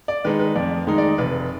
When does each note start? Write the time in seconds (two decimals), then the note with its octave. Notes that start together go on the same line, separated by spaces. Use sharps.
0.08 D5
0.25 D#3 G#3 D#4 B4
0.39 B4
0.55 F2 D5
0.87 D#3 G#3 D#4
0.98 D5
1.18 F1 B4